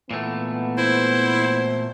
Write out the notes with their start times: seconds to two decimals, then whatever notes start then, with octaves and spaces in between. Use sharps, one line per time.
0.11 A#2 E3 A3 B3
0.78 E4 C5